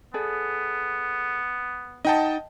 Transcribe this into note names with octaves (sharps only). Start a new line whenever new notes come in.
B3 G#4 A4 D5
D#4 D#5 F#5 G5 A5